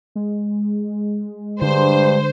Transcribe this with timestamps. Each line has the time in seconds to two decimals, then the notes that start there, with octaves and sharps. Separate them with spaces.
0.15 G#3
1.61 G2 D3 C5